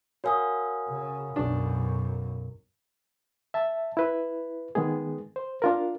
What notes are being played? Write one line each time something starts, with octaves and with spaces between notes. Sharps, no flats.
F#4 A#4 C#5 F5 G#5 D#6
C#3
B1 F#2 D4
E5 A5
E4 B4
D#3 G#3 B3 G#4
C5
D4 F4 A#4